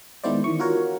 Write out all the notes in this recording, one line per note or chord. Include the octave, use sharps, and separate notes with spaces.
D#3 G#3 B3 E4 C5 D5
D#3 E3 C#6
F4 F#4 A#4 C#5